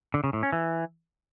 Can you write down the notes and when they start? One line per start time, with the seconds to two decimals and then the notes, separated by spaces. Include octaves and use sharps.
0.14 D3
0.24 C#3
0.33 A2
0.43 C#4
0.52 E3